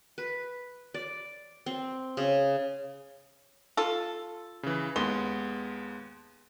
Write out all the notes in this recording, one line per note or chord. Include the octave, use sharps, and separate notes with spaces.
B4
D5
C4
C#3
F4 A4
C#3 E3
D#2 G#3 B3 C6